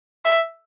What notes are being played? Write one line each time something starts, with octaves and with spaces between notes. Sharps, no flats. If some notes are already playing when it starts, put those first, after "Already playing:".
E5